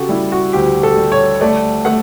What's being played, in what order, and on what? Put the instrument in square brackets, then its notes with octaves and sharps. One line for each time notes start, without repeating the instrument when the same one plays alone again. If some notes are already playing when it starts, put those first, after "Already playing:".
Already playing: [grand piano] C#3 F#4 G4 A4
G3 E4
F#4
D2 G4
A4
G3
C#5
A3 D5
A3 F#5